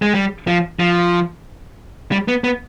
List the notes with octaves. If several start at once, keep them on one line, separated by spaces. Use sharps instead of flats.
G#3
G3
F3
F3
G3
B3
B3